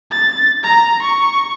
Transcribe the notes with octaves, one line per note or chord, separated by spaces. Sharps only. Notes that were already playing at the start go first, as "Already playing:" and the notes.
A6
A#5
C#6